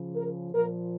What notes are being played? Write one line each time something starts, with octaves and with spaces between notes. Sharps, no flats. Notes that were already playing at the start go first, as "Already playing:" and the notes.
Already playing: C#3 F3
A#4
A#2 F3 A#4